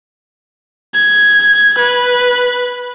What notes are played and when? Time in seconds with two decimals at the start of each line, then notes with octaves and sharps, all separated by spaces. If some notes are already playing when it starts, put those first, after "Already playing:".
0.95 G#6
1.79 B4